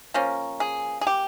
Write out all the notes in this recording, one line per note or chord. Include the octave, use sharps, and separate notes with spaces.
F3 A#3 C#4
G#4
G#4
G4